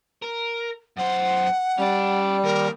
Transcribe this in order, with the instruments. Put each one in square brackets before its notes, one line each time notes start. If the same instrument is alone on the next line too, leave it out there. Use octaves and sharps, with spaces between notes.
[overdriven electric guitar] A#4
[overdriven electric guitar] F#2 C5 [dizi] F#5
[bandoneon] G3 [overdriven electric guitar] C#4 D5
[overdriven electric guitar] D#2 [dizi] A#4